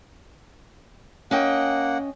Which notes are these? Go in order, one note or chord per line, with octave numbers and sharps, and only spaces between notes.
A#3 C#4 D#5 F#5 G5